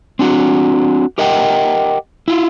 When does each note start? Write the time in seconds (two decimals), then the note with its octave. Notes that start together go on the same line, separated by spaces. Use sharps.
0.19 C4 D4 F#4
1.18 G4 A#4 D#5 E5 F#5 G5
2.28 E4 F4